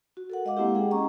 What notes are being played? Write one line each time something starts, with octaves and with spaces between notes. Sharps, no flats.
F#4
A4 A#4 F#5
G#3 D#5 F5 F#5 D6
G#3 A#3 C4 E4 G4
G#4 F#5 G5
C#4 D#5 A#5 C#6